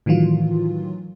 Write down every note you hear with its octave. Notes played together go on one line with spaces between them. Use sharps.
A2 D#3 E3 F#3 F4